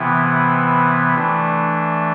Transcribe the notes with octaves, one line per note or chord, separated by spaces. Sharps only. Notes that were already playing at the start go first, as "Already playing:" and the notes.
Already playing: C3 E3 B3 E4
E3 A3 D4